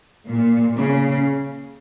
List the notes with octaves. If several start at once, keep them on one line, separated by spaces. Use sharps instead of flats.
A#2
C#3